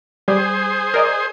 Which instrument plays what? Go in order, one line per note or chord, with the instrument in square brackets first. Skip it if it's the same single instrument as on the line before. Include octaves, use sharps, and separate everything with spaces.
[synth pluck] G3 [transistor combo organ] G#4 C5
[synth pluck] A#4 D5 D#5